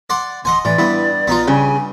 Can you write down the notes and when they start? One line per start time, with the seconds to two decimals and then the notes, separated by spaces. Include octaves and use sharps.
0.10 D5 F#5 C6
0.45 D1 D#5 F#5 G#5 C6
0.65 A2 E3 D5
0.78 G2 B3 E4
1.27 A#1 B3 D#4 F4
1.48 G2 C#3 G#5